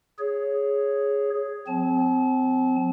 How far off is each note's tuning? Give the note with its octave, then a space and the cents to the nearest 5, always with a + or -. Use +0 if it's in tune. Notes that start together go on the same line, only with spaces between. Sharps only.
G#4 +0 C#5 +0
F3 +45 C4 -25 A5 -40